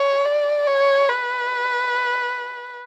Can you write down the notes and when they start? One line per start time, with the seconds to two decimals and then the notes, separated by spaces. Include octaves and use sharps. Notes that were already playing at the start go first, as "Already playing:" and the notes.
Already playing: C#5
0.25 D5
0.67 C#5
1.09 B4